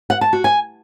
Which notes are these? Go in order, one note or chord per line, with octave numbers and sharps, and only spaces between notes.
F#5
A5
F#4
G#5